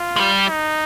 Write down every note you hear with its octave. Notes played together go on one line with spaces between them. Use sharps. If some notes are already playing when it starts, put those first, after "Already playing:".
Already playing: F4
G#3
G3
D#4